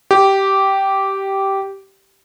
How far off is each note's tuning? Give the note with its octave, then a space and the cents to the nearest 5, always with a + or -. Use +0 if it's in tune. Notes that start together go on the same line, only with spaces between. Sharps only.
G4 -10